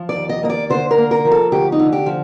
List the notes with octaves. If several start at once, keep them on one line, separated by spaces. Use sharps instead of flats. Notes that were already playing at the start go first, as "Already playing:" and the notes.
Already playing: F3
D5
D#2
D#5
A#3 D#5
D5
D3 C5
A#4
A#3
A#4
F3
A4
D2 G4
D#4
D3
G4
F3